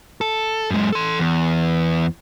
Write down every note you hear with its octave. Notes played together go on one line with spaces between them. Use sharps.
A4
F#2 G#3
A4 C6
E2